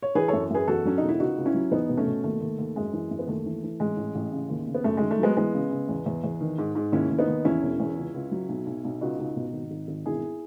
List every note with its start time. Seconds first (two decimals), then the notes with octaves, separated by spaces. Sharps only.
0.03 C#5
0.15 E3 G#4 B4
0.28 F#2 A4 C#5
0.50 F#2 G#4 B4
0.68 E2 F#4 A4
0.85 F#3 C#4
0.98 E1 D#4
1.09 E4
1.20 C#2 D#4 F#4
1.37 C#2
1.46 C#4 E4
1.54 F#3
1.71 E2 B3 D#4
1.89 B2
1.97 A3 C#4
2.07 B2
2.24 D#2 A3
2.41 D#2
2.59 D#2
2.76 F#2 G#3
2.93 E3
3.11 F#2
3.19 B3
3.28 D#2 A3
3.46 E3
3.63 E3
3.80 A1 G#3
3.97 A1
4.15 A1
4.32 C#3
4.50 D#2
4.67 C#3
4.75 B3
4.84 F#2 A3
4.97 D#3 G#3
5.11 A3
5.19 F#3 G#3 B3
5.37 E3 G#3 B3
5.54 C#3
5.71 C#3
5.89 E2
6.06 E2
6.24 E2
6.41 D#3
6.58 G#2
6.75 G#2
6.92 D#2 C#4 E4
7.10 D#2
7.19 B3 D#4
7.28 D#2
7.45 E2 C#4 E4
7.63 E1
7.80 E2
7.97 C#2
8.14 C#2
8.31 F#3
8.49 B1
8.66 B1
8.84 B1
9.01 C#2 D#4 F#4
9.18 C#2
9.36 B2
9.53 G#1
9.71 G#1
9.88 G#1
10.06 E1 E4 G#4